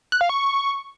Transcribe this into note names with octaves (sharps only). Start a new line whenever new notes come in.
F#6
F5
C#6